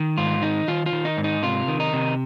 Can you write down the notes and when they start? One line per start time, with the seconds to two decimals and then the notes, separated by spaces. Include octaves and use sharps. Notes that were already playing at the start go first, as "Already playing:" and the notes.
Already playing: D#3
0.18 G#2 F4
0.42 D#3 D#4
0.68 D#3 F4
0.86 F4
0.93 D#3
1.05 D#4
1.17 G#2
1.24 D#4
1.43 C3 F4
1.68 D#3
1.80 D#4
1.93 C3